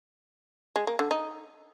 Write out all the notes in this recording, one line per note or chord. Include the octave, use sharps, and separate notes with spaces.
G#3
A#3
D3
D#4